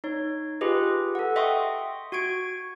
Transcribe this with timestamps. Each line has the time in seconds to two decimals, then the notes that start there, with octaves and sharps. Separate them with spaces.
0.04 D#4 C#5
0.61 F4 G4 G#4 B4 D#5
1.15 A4 F#5
1.36 D#5 E5 G5 C6 C#6 D#6
2.12 F#4 C#6 G#6 D7